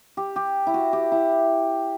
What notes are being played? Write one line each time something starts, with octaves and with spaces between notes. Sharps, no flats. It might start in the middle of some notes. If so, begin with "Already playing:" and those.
G4
G4
E4
F#4
G4
E4